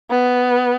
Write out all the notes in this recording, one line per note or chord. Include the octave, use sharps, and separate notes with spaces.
B3